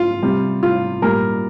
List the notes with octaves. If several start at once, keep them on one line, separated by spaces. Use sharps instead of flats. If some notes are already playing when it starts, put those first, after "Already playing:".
Already playing: F4
C3 G3
F4
A#2 G3 A#4